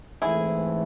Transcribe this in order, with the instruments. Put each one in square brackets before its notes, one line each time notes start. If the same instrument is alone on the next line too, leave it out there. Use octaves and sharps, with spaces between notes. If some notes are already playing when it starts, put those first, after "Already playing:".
[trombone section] G#2 E3 A3 C4 [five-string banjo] E4 G#4